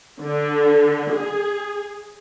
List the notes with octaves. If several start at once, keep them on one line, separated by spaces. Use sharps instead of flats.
D3
G#4